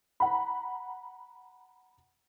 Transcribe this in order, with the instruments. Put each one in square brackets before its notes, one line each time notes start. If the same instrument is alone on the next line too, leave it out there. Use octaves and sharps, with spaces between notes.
[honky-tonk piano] F#5 A#5 B5